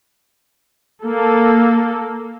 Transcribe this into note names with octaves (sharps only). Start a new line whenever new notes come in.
A#3 A4